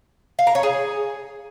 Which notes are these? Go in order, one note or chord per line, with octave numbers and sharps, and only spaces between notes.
F5
A#5
C#5
G#4